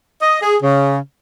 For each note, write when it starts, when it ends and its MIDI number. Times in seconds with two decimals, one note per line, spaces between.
0.21 0.38 75
0.41 0.56 68
0.62 0.97 49